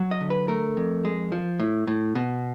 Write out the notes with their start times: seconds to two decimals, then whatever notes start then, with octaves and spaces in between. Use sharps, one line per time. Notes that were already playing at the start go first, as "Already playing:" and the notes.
Already playing: F#3
0.11 D#5
0.21 D3
0.30 B4
0.48 A3 A#4
0.77 F2
1.05 G#3
1.32 F3
1.60 A2
1.87 A2
2.15 B2